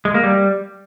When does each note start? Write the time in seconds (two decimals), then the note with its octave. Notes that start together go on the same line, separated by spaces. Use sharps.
0.05 G#3
0.14 A#3
0.24 G3